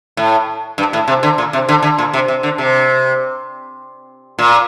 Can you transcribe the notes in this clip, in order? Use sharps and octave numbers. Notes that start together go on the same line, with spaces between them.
A2
G2
A2
C3
D3
A#2
C3
D3
D3
A#2
C3
C3
D3
C3
A#2